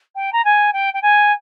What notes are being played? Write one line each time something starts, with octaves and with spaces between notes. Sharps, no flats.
G5
A#5
G#5
G5
G5
G#5